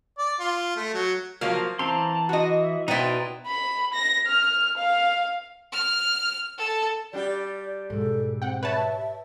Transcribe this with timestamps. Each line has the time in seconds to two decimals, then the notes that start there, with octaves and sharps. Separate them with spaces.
0.18 D5
0.40 F4
0.77 A3
0.94 F#3
1.41 F3 F#3 A#3 F5
1.79 E3 C4 A5 A#5 C6
2.29 F#4 D#5
2.62 E5
2.88 B2 D#4 E4 D5 G5 C6
3.47 B5
3.94 A#6
4.27 F6
4.77 F5
5.72 F6
6.58 A4
7.13 G3 D4 G4 D5
7.90 G#2 B2 A4
8.42 C4 F#5 G5
8.63 B4 C#5 E5 A5